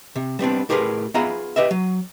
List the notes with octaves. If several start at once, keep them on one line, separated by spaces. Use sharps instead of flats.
C3
G3 B3 C4 D4
A2 G4 G#4 A#4 B4 C6
B3 F4 G#4 E5 A#5 B5
G4 B4 D#5 E5
F#3